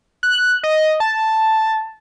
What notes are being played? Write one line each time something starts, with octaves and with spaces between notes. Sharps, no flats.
F#6
D#5
A5